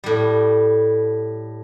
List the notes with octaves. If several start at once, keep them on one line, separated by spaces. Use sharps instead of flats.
A2 G3